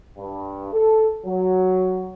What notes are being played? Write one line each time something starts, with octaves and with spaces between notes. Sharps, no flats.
G2
A4
F#3